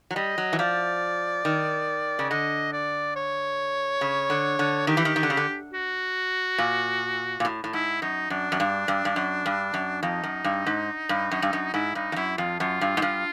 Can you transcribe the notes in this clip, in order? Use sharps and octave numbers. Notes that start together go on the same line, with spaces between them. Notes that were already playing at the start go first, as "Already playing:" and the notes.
F#3
G3 D#5
F#3
E3
F3 D5
D#3
C#3
D3 D#5
D5
C#5
C#3
D3
D3
D#3 G4
E3
D#3
D#3
D3
C#3
D3
F#4
A#2
A#2
A2
A2
G#2 E4
F#2 D#4
F#2 D4
F#2
G2
G2
G2
F#2
G2
F#2
F2 D#4
F#2
G2
G#2
G2
F#2
G2
F#2
G#2 E4
G2 D#4
F2
F#2 E4
F2 F4
F#2 F4
G2
G#2
G2